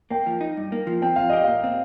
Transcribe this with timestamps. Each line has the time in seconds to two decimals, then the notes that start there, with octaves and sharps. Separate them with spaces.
0.10 A#3 G5
0.26 F3
0.41 D#4
0.57 G2
0.72 A#3
0.87 F3
1.02 C4 G5
1.16 F3 F5
1.30 G4 D#5
1.44 A#2 F5
1.64 C4